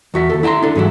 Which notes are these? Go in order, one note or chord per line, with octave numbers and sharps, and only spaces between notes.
E2 F#4 E5
D#2 A4
E4 E5 G5 A#5 C6
D4 A4
G#2 E3 F#3 E4